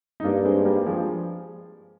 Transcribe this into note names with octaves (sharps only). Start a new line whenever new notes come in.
D#4
G2 A#3 D4
G#3 C4
G3 A#3
F3 G#3